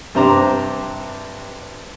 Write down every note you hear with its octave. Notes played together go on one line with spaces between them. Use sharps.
G2 C3 C5 A#5 D6